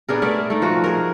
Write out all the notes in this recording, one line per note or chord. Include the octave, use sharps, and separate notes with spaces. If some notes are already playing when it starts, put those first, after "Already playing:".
B3 D4 G#4 A#4
A3 A#4 D5 E5
A3 D#4
F3 F#4
G#4 A#4